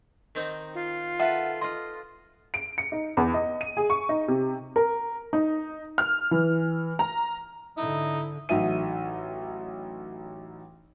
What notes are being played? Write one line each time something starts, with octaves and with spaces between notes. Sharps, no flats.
D#3 C4 D#4
F4
A4 B4 E5 F#5
F4 D#5 C6
D7
C#7
D#4
E2
D#5
D#7
G#4
C#6
D#4
C3
A#4
D#4
F6
E3
A#5
G#2 D3 D#4 E4
A1 F#3 D#4 E5 D#7